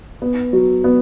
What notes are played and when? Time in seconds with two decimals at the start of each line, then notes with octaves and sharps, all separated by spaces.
0.22 B3
0.53 F#3
0.84 B3